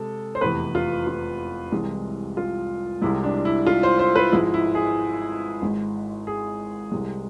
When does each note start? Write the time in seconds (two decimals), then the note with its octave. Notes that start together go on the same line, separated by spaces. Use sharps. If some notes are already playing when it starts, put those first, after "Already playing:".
Already playing: C3 G#3 A4
0.35 C5
0.41 F1 E2 C3 E3 B4
0.75 F4
1.07 F4
1.72 C2 C3 E3 G#3
2.37 F4
3.02 C2 C3 G#3 E4
3.24 D4
3.45 E4
3.66 F4
3.83 C5
3.99 C5
4.16 B4
4.32 G#1 G#2 F3 G#3 E4
4.54 E4
4.75 G#4
5.62 G#1 G#2 G#3
6.27 G#4
6.92 C2 C3 G#3